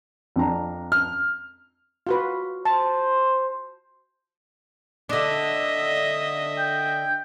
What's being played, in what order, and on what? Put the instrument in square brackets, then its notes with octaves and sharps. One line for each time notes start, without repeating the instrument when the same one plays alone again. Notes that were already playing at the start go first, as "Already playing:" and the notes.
[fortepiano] F2 D4 A#5
[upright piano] F6
[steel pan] F4 F#4 B4
[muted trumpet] C5 [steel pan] A5
[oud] D3 D4 [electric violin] D#5 E5
[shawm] G5